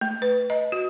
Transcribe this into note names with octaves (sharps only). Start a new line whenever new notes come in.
A3
B4
D#5
F#4